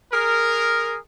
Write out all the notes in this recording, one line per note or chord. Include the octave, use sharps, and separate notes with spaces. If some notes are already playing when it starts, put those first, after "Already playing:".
G#4 A#4